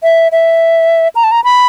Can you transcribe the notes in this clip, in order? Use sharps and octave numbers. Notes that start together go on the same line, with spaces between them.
E5
E5
A#5
A5
A#5
B5